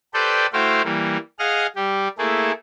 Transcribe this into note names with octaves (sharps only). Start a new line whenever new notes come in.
G4 A4 B4 C5 D5 G5
A3 E4 F#4 C5 F5 G5
E3 G3 A#3
G#4 D#5 F5 F#5 F6
G3 G4
A3 A#3 E4 G#4 A4